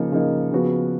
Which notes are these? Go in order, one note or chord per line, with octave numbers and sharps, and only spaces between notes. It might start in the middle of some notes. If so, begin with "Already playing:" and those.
Already playing: C#3 F3 A#3 D#4
C#3 F3 A#3 D#4
C#3 F3 B3 F#4